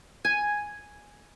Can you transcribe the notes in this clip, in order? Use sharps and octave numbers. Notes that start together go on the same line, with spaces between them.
G#5